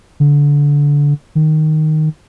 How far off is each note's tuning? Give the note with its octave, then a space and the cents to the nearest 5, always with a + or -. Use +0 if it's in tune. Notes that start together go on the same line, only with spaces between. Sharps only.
D3 -20
D#3 -5